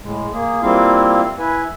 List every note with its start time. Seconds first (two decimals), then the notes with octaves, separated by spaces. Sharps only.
0.03 A2 G#3
0.33 A#3 G#4
0.62 G3 A#3 C4 E4 F4 F5
1.39 E4 B4 G#5